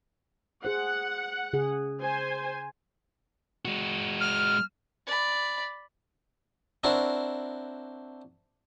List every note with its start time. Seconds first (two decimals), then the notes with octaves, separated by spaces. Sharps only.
0.65 G#4 C5 F#5
1.53 C#3 G#4
2.01 C5 G#5
3.65 G#3 F#4
4.21 F6
5.07 D5 B5
6.84 C4 D4 E4 F#4 A#4 C5